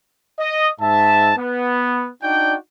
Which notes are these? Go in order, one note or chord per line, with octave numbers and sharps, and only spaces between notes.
D#5
G#2 E5 A5
B3
D4 D#4 F#4 D5 G5